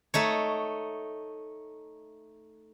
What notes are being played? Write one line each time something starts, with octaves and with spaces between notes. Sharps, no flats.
A3 D#4 C#5